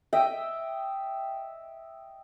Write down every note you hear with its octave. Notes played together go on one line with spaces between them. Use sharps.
D#5 E5 G5